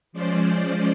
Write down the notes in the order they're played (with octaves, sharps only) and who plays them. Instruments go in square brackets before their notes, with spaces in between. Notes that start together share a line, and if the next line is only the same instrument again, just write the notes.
[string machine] F3 G#3 C#4 C5 D5